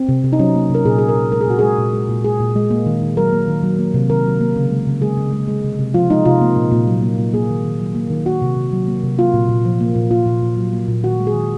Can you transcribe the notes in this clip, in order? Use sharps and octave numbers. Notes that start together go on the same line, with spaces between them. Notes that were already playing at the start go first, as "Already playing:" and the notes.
Already playing: C4
C3
C3
D#4
F#3 C#4
A#3
C3 A#4
A#2 G#4
G#3 G#4
A#4
A#2
G#3 A#4
G#4
A#2 F#4
G#3 G#4
A#2
G#3
A#2
G#3 G#4
A#2
G#3
A#3
D#3
D#3
F#3 A#4
A#3
D#3
F#3
A#3
C3
D#3 A#4
F#3
A#3
C#3
G#3
C#3
G#3 G#4
C#3
G#3
G#3
C3
C3
F3 F4
G#3 D#4
C3 F4
A#3
A#2
A#2
F#3
A#3
A#2
A#3 G#4
D#3
D#3
F#3
A#3
D#3
A#3 F#4
C3
C3
F#3
A#3
C3
A#3 F4
A#2
A#2
F3
A#3
A#2
A#3 F4
A#2
A#2
F#3
A#3
A#2
D#3 F#4
G#3
G#4
D#3